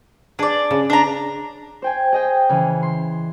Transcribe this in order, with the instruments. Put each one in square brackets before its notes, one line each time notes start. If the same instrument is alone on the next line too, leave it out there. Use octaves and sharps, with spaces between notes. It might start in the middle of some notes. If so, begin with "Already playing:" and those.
[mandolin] D4 D5 [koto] G#4
[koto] C#3
[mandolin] D4 A#5
[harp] C5 G5 G#5
G#4 D#5 G5
C#3 E3
C6